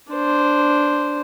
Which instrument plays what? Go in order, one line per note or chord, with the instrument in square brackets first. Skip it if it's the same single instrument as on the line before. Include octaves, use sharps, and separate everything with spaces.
[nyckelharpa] D4 C5